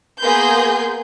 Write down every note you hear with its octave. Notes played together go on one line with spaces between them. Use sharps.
A#3 B3 G#4 B4 C6 G6